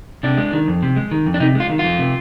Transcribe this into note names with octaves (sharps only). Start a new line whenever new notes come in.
C3 D4
G#3
D#3
F2
C3
G#3
D#3
F2
D4
C3 D#4
G#3 F4
D#3
F4
F2
C3